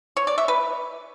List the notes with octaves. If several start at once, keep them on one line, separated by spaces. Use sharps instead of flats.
C#5
D5
E5
B4